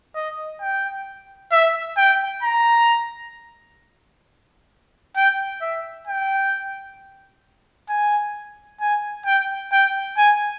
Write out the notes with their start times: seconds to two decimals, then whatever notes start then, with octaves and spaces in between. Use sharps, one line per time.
0.15 D#5
0.61 G5
1.52 E5
1.97 G5
2.43 A#5
5.16 G5
5.61 E5
6.07 G5
7.89 G#5
8.81 G#5
9.26 G5
9.72 G5
10.18 G#5